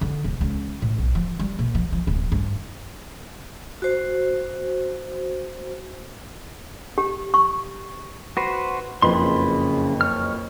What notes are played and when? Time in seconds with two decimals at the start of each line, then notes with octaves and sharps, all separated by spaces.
0.01 D3
0.24 D1
0.41 C#2
0.82 A2
0.98 B1
1.15 F3
1.39 G3
1.59 A#2
1.75 F3
1.92 F3
2.07 D1
2.32 G2
3.82 F#4 C5
6.98 G4
7.34 C#6
8.37 F#4 B4 C5
9.02 F#1 F2 C#3 B4 B5 C6
10.01 C#5 F6